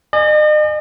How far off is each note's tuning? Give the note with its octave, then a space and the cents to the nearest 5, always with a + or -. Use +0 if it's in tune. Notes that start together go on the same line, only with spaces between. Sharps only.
D#5 -40 G#5 +0